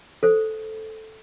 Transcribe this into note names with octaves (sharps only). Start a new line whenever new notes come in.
A4 C5